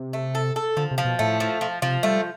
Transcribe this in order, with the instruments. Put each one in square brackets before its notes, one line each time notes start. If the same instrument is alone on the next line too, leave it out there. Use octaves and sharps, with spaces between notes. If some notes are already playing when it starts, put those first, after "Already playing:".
Already playing: [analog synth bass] C3
[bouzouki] A3
A4
A4
[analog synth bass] D3 [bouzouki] F3
[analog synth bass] C3
[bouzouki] F3
[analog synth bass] B2
[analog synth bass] A2 [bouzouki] A3
[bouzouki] F3
F3
[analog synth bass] C3 [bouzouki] F3
[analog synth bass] G3 [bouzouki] A3